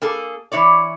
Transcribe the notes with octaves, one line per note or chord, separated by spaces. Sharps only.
A#3 G#4 A4
E3 E4 C#5 D5